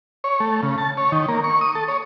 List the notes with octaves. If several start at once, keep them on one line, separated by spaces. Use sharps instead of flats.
C#5
A3
C#3
A5
C#5
D#3
A#3
C#6
D#6
A4
C#5